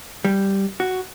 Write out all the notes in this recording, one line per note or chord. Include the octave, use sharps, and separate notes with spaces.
G3
F#4